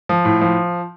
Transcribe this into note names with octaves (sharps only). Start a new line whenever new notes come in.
F3
A2
F3